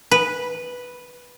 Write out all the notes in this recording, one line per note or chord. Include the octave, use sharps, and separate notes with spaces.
B4